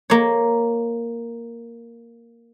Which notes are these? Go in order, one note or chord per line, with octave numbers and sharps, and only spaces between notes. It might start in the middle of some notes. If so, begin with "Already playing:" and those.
A#3 C#5